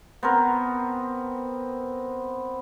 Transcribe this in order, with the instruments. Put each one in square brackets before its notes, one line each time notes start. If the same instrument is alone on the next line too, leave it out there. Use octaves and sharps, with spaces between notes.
[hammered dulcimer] B3 C4 A#4